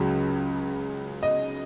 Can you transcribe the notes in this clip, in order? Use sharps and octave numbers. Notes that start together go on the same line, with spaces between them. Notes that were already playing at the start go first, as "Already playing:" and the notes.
Already playing: C#2 C#3 F#3
D#5